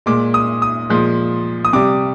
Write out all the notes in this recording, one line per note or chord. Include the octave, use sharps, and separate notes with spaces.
A#2 G#3 D6
D#6
D#6
A#2 F3 G#3
D#6
C3 G3 D6